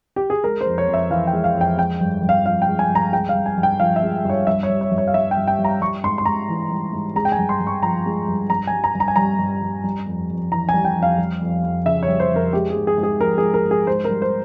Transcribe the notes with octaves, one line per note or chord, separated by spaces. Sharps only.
G4
G#4
G#3 A#4
C5
F2
C#5
F2
E5
E3 F5
G5
G#3
F5
F2
G5
G#3 G5
G2
G2
F5
F3 F5
G5
G#3
G#5
G2
A#5
G#3 G5
F5
G2
G#5
G2
G5
F3 F5
E5
G#3
G2 C#5
G2 E5
C#5
G3
C#5
G2
C#5
F5
G3 E5
G5
G2
G5
G3
A#5
G3 C#6
G#2 C6
C6
G#2 A#5
E3
G3
G#2
G#3 A#5
G5
G#5
G2
C6
G2
C#6
F3 A#5
G#3
G2
G2 A#5
G3 G#5
A#5
G2
A#5
G#5
G3 A#5
G2
G3
G3
F2
F2
E3 A#5
G#5
G3
G5
F2
F5
G3
F2
F2
C#3 E5
C#5
G3
C5
F2
A#4
G#3 G4
G#4
G#2
G#4
G#2
G#4
F3 A#4
G#3 G#4
A#4
G#2
G#4
G#2 C5
A#4
G3
C5